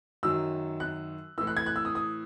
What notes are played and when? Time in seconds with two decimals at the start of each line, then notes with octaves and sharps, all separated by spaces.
0.23 F#2 D#3 F#3 E6
0.80 F#6
1.38 A2 E3 E6
1.47 F#6
1.57 G#6
1.66 F#6
1.76 E6
1.85 D#6
1.95 D#6